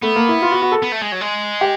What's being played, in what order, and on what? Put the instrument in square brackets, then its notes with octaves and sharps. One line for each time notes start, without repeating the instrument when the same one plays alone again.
[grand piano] A3 [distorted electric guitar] B3
[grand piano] A#3
E4
F4
F#4
F#4
A4
[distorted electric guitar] B3
A3
G#3
F#3
G#3
[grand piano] G4